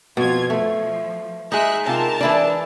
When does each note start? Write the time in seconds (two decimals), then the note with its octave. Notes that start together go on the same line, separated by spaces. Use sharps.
0.17 F2 B2 F4 G#6
0.50 F3 A3
1.52 G#3 D#4 E5 F#6
1.87 C3 F4 A#4 A5
2.21 E3 D4 E4 D5